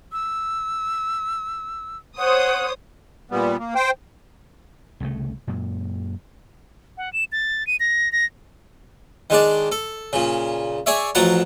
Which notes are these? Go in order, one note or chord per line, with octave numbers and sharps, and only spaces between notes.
E6
C5 C#5 F#5 D#6
A#2 G3 B3
A#3
C5 G5
C2 C#3 A3
F#2 A#2
F#5
E7
A6
D#7
A#6
A#6
D#3 G#3 D4 D5
A4
A#2 C#3
G#4 C#5 D5 E5
A1 F3 F#3 F#5 A5 A#5